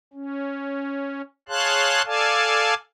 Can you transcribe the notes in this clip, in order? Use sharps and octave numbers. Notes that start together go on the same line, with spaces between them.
C#4
G#4 C#5 F5 A5 C6 F#6
A4 D5 F5 G#5 A5